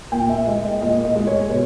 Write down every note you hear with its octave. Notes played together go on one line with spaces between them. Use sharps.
A#2 G5
E5
G#3 D#5
D#5
A#2 D#5
D#5
G#3
C#5
B2 C#5